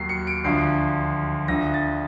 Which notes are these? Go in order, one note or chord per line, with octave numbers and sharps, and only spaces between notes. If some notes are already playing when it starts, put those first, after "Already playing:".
Already playing: D#2 D#3 F#3 C7
C#7
D7
D2 D3 F3 C7
D2 D3 F3 A#6
A6